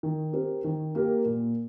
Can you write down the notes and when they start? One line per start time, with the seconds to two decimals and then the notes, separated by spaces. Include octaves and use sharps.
0.03 D#3
0.33 C4 G4 A#4
0.64 D#3
0.95 A#3 G4 A#4
1.26 A#2